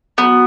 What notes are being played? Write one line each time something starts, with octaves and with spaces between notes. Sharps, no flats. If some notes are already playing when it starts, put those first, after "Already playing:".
F#3 B3